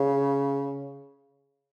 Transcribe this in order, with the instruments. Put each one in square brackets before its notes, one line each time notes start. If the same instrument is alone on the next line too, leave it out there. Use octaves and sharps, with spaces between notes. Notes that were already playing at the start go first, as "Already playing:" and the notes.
Already playing: [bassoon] C#3